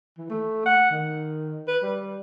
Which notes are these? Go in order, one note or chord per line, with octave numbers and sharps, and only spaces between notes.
E3
A3
F#5
D#3
B4
G3